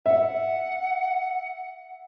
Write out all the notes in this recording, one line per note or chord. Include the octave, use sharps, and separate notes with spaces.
E5 F#5